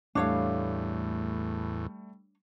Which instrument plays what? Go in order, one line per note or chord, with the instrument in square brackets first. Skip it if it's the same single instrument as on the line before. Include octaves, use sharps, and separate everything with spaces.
[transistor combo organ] E2 A2 [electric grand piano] G3 A3 [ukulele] D4 C#5 F5